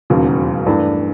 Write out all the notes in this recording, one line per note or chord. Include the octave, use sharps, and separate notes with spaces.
E1 D#2 C#3 F#3
G2 E3 A3 D4